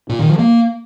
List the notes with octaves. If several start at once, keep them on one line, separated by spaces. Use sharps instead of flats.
A#2
D#3
F3
A#3